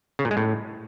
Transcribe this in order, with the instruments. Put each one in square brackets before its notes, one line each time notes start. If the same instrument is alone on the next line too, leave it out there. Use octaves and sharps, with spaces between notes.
[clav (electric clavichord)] C#3
A#2
G#3
A2